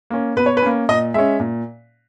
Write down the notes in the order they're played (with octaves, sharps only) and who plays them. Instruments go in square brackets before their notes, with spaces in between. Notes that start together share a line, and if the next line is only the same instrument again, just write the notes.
[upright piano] A#3 C#4
B2 B4
C#5
B4
A#3 C#4
A#2 D#5
G#3 C#4 E5
A#2